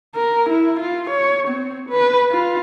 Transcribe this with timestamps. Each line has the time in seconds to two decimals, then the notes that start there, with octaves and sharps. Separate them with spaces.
0.16 A#4
0.50 E4
0.80 F4
1.11 C#5
1.48 C4
1.90 B4
2.31 F4